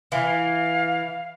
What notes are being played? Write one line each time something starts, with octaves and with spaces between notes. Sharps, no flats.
E3 F5